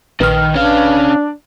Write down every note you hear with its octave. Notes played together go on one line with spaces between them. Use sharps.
A#1 D#3 B4 F6
C#4 D4 F5